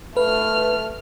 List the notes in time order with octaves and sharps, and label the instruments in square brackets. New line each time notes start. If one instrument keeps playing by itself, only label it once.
[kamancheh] A3 F6 [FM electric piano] B4